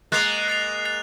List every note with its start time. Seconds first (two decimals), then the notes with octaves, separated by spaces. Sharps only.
0.12 G#3 A#3 F#6 A6 C7 F7
0.48 F#6 A6 C7 F7
0.85 F#6 A6 C7 F7